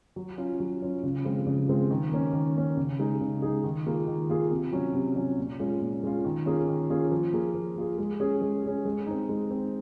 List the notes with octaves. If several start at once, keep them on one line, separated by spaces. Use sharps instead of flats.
F#3
C#4 F4
F#3
C#4 F4
C#3
F3 G#3 C4 F4
C#3
F3 G#3 C4 F4
D#3
A#3 C#4
D#3
A#3 C#4
C#3
G#3 D#4 G#4
C#3
G#3 D#4 G#4
D#3
A#3 F4 G#4
D#3
A#3 F4 G#4
C3
F#3 C#4
C3
F#3 C#4
A#2
G#3 C#4 F4
A#2
G#3 C#4 F4
D#3
A#3 C#4 F4 G#4
D#3
A#3 C#4 F4 G#4
F3
A#3 F4 G#4
F3
A#3 F4 G#4
G#3
C#4 G#4
G#3
C#4 G#4
G#3
C4 D#4
G#3
C4 D#4